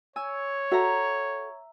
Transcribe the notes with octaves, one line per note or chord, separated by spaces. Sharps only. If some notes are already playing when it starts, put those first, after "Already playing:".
C#5 G#5 E6
F#4 A4 E5 F#5 A#5